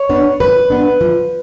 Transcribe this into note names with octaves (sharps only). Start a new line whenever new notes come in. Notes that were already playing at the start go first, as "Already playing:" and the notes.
Already playing: C#5
B3 D4
F3 B4
B3 D4
F3